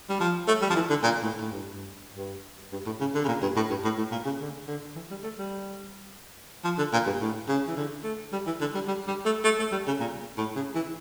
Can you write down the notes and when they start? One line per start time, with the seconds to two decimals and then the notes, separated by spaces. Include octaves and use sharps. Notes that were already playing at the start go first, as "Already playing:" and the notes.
0.09 G3
0.20 F3
0.48 A3
0.61 G3
0.70 F3
0.75 E3
0.90 D3
1.03 A#2
1.23 A2
1.41 A2
1.52 G2
1.73 G2
2.16 G2
2.72 G2
2.86 A2
3.00 C#3
3.15 D3
3.24 C#3
3.28 A#2
3.42 G2
3.56 A2
3.70 G2
3.84 A2
3.98 A2
4.12 A#2
4.25 C#3
4.41 D3
4.68 D3
4.96 E3
5.10 G3
5.23 A3
5.38 G3
6.64 F3
6.78 D3
6.93 A#2
7.06 G2
7.21 A2
7.48 C#3
7.67 E3
7.76 D3
8.04 A3
8.33 G3
8.46 E3
8.61 D3
8.74 G3
8.88 G3
9.08 G3
9.25 A3
9.44 A3
9.59 A3
9.72 G3
9.87 C#3
10.00 A#2
10.38 A2
10.56 C#3
10.75 E3